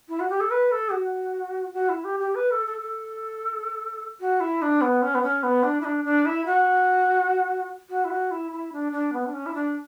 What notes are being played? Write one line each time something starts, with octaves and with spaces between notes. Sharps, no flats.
E4
F#4
G4
A4
B4
A4
F#4
F#4
E4
G4
G4
B4
A4
A4
A4
F#4
E4
D4
B3
C#4
B3
C#4
B3
D4
E4
D4
D4
E4
F#4
F#4
E4
F#4
E4
E4
D4
D4
B3
D4
C#4
E4
D4